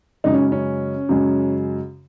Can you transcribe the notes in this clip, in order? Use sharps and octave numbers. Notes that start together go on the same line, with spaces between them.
F#2 C#3 G#3 D#4
C#4
C#4
F#2 C#3 G#3